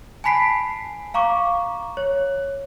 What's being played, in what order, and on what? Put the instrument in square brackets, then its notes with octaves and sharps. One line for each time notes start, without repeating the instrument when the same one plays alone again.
[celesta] G#5 A5 B5 B6 C7 D7
F5 A#5 C#6 D6
C#5